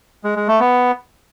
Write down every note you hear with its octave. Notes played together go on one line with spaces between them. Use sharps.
G#3
G#3
A3
B3